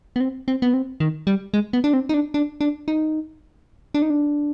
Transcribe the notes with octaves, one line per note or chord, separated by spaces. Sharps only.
B3
C4
C4
B3
C4
D#3
G3
G#3
B3
D4
C4
D#4
D4
D4
D4
D#4
D4
D#4
D4